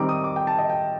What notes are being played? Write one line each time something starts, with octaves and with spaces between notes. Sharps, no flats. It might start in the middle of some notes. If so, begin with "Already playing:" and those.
Already playing: D#3 G3 C4 D#4 D6
D#6
D6
G5
A5
D#5
G5